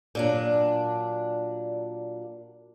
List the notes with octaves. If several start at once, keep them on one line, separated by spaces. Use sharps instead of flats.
A#2 F#3 D4